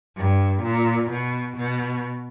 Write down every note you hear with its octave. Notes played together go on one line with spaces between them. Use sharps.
G2
A#2
B2
B2